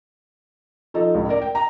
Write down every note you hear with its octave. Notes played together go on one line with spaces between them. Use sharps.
F3 D#4 A4
C#2 A2
A#4 D5
G5
A#5